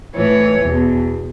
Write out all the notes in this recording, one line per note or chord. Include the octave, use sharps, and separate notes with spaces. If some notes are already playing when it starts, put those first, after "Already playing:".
A2 E3 C#5
E2 B2